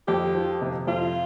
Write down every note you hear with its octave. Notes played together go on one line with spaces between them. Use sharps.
F2 G4
F3
C3
F2 F4